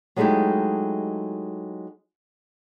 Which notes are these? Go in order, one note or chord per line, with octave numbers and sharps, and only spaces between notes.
F#3 G#3 A3 D#4 E4 G4